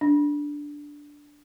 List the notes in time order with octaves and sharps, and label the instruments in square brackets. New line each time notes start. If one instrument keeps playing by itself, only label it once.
[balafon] D4